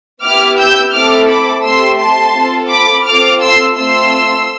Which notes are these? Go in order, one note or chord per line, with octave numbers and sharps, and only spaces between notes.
B3 E4 G4 D6 F6
E6 G6
A3 C4 E4 A4 D6 F6
B5 D6
A3 C4 G4 C6 E6
A5 C6
C4 F4 A4
B5 D6
C4 F4 A4 D6 F6
C6 E6
A3 C4 F4 C6 E6